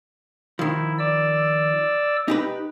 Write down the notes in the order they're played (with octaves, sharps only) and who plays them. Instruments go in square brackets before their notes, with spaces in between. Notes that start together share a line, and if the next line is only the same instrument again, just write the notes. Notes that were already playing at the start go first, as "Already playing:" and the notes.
[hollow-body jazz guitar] D#3 F3 [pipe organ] E4
[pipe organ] D5 E6
[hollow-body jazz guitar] D#4 G4 B4